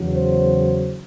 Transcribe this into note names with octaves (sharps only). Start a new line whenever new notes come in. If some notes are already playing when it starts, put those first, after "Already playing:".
Already playing: E2 C#3 F#3
C5